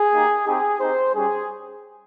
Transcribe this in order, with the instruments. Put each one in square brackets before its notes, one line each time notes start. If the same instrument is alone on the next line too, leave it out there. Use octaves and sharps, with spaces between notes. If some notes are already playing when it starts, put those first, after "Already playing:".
Already playing: [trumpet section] G#4
A#3 D#4 G4
C4 D#4 G4 G#4
C4 D#4 G4 C5
G3 C#4 G4 G#4